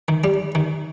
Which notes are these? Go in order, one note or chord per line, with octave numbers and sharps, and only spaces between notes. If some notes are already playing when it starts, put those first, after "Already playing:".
D#3
G3
D#3